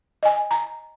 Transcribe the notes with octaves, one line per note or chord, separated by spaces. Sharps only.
D#5 G#5
A#5